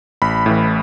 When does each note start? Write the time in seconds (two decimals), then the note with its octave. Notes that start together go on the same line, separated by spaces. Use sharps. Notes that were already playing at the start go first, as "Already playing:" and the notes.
0.22 A1 B5
0.46 A2 E3